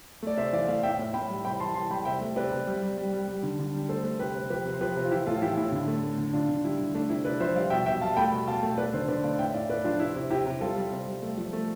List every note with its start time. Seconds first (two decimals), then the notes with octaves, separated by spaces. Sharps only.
0.23 A3 D5
0.37 C3 C5 E5
0.53 E3 D5 F5
0.68 A3 D5 F5
0.83 A2 E5 G5
0.99 A2
1.14 A2 G5 B5
1.29 G3
1.45 C3 G5 B5
1.60 E3 A5 C6
1.75 E3 A5 C6
1.90 G3 G5 B5
2.05 C3 E5 G5
2.21 A3
2.36 C3 B4 D5
2.52 C3
2.67 G3
2.82 G3
2.97 G3
3.13 G3
3.28 G3
3.43 D3
3.59 D3
3.74 G3
3.89 A3 A4 C5
4.04 A3
4.19 C3 G4 B4
4.35 C3
4.50 F3 G4 B4
4.66 C3
4.73 C5
4.81 F3 G4 B4
4.96 C3
5.04 F4
5.11 E3 E4 G4
5.26 A2 F4 A4
5.42 E3 E4 G4
5.57 A2 E4
5.72 D3
5.87 A3
6.03 A3
6.18 D3
6.33 D3 D4 F4
6.49 D3
6.64 G3 E4
6.79 D3
6.94 A3 D4
7.10 C3 E4
7.25 C3 B4 D5
7.40 F3 C5 E5
7.55 G3 D5 F5
7.70 B2 E5 G5
7.86 B2 E5 G5
8.01 G3 F5 A5
8.17 A3 G5 B5
8.32 B2
8.47 B2 F5 A5
8.63 A3
8.78 A3 B4 D5
8.93 D3 A4 C5
9.08 D3 B4 D5
9.24 A3 D5 F5
9.39 A2 E5 G5
9.49 E5
9.54 A2 D5 F5
9.69 A3 B4 D5
9.84 F3 D4 F4
10.00 C3 E4
10.15 C3
10.30 C3 E4 G4
10.46 C3
10.61 G3 F4 A4
10.77 G3
10.92 C3
11.07 G3
11.22 A3
11.38 F3
11.53 A3